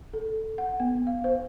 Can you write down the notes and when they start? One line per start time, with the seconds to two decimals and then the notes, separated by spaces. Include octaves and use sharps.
0.13 A4
0.58 F#5
0.80 B3
1.07 F5
1.24 C5